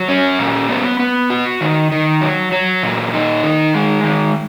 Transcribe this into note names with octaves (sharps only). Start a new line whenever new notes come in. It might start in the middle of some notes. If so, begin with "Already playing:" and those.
Already playing: F#3
C#4
A#2
B3
B3
F#4
D#3
D#3
F#3
F#3
A#2
D#4
D#3
G#3
D#3